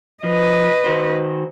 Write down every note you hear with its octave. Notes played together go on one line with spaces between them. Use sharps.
F3 B4 D#5
D#3 F#4 C5